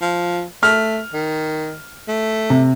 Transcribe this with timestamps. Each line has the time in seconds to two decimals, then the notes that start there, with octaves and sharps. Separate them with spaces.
0.01 F3
0.63 A3 F6
1.14 D#3
2.08 A3
2.50 C3